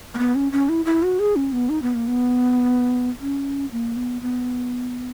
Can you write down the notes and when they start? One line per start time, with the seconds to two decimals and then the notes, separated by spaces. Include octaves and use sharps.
0.14 A#3
0.18 B3
0.35 C#4
0.52 C#4
0.69 E4
0.85 E4
1.03 F#4
1.19 G#4
1.36 C#4
1.53 B3
1.69 D#4
1.82 B3
1.95 A#3
2.08 B3
3.21 C#4
3.72 A#3
3.96 B3
4.22 B3